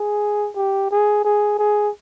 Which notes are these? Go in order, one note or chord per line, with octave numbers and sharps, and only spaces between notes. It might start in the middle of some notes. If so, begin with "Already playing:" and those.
Already playing: G#4
G4
G#4
G#4
G#4